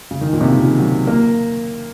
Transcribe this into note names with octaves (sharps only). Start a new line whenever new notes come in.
C#3
D#3
A#2
C3
C#3
D#3
F3
F#3
A#3